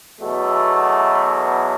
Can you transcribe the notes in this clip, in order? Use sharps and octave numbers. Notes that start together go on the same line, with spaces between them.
E2 B2 F#3 A3